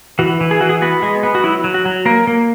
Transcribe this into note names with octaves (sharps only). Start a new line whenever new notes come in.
E3 F#4
E3
G#4
E3 F#4
G#4
B3 F#4
G#3
B3
F#4
F#3 E4
F#3
F#4
F#3
A#3 A#4
A#3